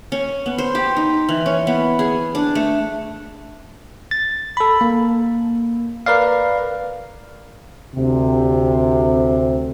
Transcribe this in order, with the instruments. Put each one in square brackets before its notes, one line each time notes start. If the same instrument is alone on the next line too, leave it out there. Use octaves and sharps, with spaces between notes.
[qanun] C#4
B3
C5
G4
D#4
E3
C#4
B3
G#4
D4
A3
[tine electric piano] A6
A4 B5
A#3
A#4 B4 D5 F5
[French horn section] D2 C3